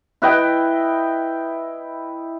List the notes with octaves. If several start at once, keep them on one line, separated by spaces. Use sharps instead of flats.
E4 B4 D#5 G5